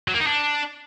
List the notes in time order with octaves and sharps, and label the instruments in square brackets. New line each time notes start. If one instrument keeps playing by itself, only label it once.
[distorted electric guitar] F#3
A#3
D#4
D4